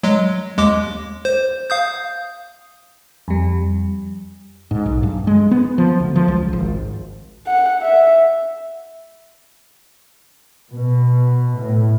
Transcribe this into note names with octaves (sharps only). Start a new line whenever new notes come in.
F#3 G#3
D#2 G#3 D6
C5
F5 D#6 G6
F2 G3
G#2
B1
G2
G#3
B3
F3
D2
F3
C#2
G#1
F#5
E5
B2
A2